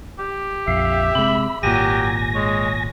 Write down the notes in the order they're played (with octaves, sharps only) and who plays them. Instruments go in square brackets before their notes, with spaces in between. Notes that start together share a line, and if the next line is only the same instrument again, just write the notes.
[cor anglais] G4
[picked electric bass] A#1 F2 [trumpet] E5 [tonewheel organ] F5
[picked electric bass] C3 G#3 [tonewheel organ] B5
[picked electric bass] G#1 A#2 [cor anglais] F#3 [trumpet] G4 [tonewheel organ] G#5 A#6
[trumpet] G#3 [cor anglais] C#5